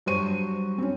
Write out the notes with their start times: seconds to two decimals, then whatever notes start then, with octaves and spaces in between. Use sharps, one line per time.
0.06 G2 F#3 F#4 C5 C#6 D#7
0.78 C4 C#4